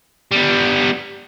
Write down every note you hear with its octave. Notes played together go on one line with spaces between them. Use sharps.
G3 B3